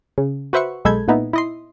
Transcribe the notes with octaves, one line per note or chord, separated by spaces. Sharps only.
C#3
F#4 B4 C5 E5 F#5 C#6
B1 G#3 A4 B5 G6 G#6
A#2 B3 D#4 E4
E4 D#5 C6